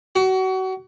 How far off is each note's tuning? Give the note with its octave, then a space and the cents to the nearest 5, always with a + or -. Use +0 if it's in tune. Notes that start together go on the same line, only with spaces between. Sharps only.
F#4 +30